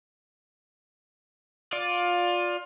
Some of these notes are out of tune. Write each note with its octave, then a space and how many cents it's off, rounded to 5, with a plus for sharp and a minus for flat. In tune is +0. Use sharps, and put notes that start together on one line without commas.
F4 +20 D5 +0